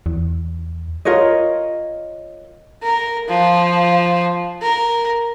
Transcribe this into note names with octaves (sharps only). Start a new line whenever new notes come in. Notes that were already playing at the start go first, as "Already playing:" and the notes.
E2
F4 A#4 C#5 D#5
A#4
F3
A#4